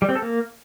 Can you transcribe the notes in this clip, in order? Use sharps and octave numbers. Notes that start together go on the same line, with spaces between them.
G3
C4
A4
A#3